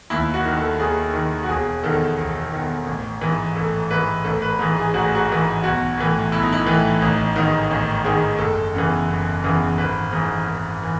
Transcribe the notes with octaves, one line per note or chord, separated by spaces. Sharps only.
D#2 E4
F#4
D#3
A4
D#2 G#4
D#3
F#4
E1 G#4
E2 D#3 A4
E1
E2 D#3
A1
G#2 E3
A1 A4
G#2 E3 B4
A1 A4
B4
G#2 E3
G#4
A1 F#4
G#4
F#4
G#2 E3
B1 F#4
A2 E3
B1 E4
D#4
E4
A2 E3
A1 D#4
G#2 D#3 D#4
A1
G#2 D#3 G#4
F#1 A4
E2 C#3 E3
F#1
E2 C#3 E3
G#1 B4
G#2 E3
G#1
E3